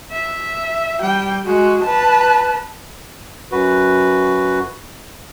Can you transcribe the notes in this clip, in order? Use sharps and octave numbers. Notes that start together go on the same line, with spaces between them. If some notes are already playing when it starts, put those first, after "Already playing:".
E5
G3 G5
G#3 F#4
B4 A5
F#2 F#4 B4